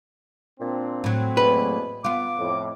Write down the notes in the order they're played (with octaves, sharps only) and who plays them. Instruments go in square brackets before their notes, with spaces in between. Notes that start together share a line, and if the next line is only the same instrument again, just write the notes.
[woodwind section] A#2 D4 [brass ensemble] C4
[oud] A2 F#3
[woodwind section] E2 B2 A#3 [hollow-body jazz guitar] B4
[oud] B3 F4 [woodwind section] D6
[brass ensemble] F2 A2